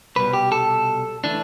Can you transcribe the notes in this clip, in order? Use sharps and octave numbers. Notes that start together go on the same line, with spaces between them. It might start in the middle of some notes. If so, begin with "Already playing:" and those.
C2 B2 G3 B4
G4
A4
E3 A3 D4